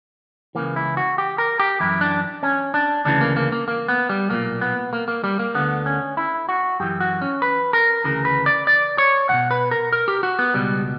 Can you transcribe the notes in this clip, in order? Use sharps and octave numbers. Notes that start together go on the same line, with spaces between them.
C#2 C#3 E3 A#3
E4
F#4
G4
A#4
G4
F#2 E3 E4
D4
C#4
D4
D2 C#3 E3 D4
A#3
A#3
A#3
A#3
B3
G3
B1 A#2 A#3
B3
A#3
A#3
G3
A#3
D2 D3 B3
C#4
E4
F#4
F#2 E3 G4
F#4
C#4
B4
A#4
D2 C#3 E3 A#4
B4
D5
D5
C#5
B1 B2 F#5
B4
A#4
A#4
G4
F#4
B3
C#2 B2 G3